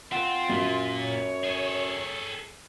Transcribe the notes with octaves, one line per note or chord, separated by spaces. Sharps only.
C4 F4 F#5
F#2 A#2
C#5
G#4 A4